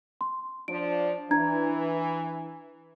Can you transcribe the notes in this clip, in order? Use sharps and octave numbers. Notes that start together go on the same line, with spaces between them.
C6
F3 D4 D7
E3 D4 A#5 G#6